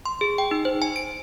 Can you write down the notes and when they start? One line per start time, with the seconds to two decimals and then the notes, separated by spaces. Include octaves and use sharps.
0.06 C6
0.21 G#4
0.38 G5
0.51 D#4
0.65 C5
0.82 G#5
0.96 D7